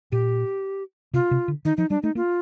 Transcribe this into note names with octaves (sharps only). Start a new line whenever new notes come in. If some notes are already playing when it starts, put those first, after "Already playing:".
A#2 G4
C3 F4
C3
D3
D#3 D#4
F3 D#4
G3 D4
A3 D#4
A#3 F4